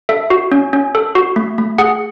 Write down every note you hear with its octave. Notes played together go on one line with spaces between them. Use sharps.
A4 E5
F#4
C#4
C#4
A4
F#4
A3
A3
G#4 F#5